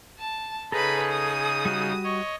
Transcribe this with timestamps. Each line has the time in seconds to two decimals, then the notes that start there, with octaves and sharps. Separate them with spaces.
0.19 A5
0.72 C#3 D#4 G#4 A4 B4 A#5 B5
1.11 D#6
1.65 G3 F#4
2.04 C#5 D#5 C#6